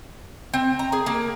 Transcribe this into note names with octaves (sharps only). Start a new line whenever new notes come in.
C4
A#5
G#4
A#3